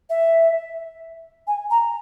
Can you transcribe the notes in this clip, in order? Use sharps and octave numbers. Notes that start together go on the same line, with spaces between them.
E5
G#5
A#5